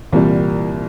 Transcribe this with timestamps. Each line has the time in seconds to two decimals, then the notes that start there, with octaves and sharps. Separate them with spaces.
0.12 C2 A#2 E3 G3